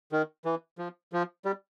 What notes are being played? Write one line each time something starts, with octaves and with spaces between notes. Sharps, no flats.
D#3
E3
F3
F3
G3